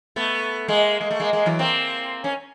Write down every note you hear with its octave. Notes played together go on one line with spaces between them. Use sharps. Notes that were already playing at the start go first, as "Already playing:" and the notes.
A3 B3
G#3 A#3
G#3
A3
G#3 A#3
G#3 A#3
E3 F#3
A#3 C4
C#4